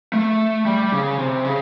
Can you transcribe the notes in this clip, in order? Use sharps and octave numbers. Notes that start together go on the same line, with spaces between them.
A3
G3
C#3
C3
C#3